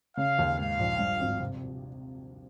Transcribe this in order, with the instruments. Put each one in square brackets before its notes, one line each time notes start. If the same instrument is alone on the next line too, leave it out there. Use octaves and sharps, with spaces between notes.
[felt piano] C#3 [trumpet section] F5
[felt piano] D#2
[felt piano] G#2 [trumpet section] F5
[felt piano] A#1
G2
G#1
C3